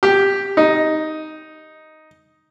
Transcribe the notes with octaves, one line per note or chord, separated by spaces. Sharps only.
G4
D#4